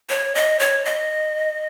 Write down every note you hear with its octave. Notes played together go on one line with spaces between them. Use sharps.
C#5
D#5
C#5
D#5